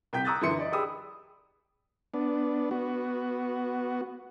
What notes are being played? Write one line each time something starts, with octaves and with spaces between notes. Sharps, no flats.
C2 G5 G6 B6
A#5 C#6 D#6 E6 F#6 A6
F#2 D3 E3 E5 C6 C#7
D5 D#5
G4 G#4 B5 D#6 E6
B3 D4
B3 F#4